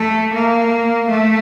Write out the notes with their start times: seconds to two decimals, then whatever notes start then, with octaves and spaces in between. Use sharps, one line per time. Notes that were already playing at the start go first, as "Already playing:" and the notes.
Already playing: A3
0.32 A#3
1.09 A3